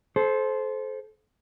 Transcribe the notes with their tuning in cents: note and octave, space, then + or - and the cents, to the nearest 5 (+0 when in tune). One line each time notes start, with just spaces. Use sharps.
A4 -30 C5 +0